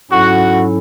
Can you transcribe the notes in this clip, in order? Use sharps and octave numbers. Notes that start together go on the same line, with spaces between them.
G#2 F#3 C#4 E4 F#4 A4